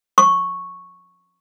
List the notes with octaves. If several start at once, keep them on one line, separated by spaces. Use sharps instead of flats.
C#6